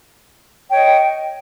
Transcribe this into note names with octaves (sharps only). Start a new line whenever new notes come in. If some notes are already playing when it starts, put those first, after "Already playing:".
C#5 D#5 G5